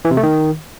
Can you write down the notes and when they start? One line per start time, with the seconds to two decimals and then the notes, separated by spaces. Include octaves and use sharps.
0.05 E3
0.11 C3
0.17 A3
0.23 D#3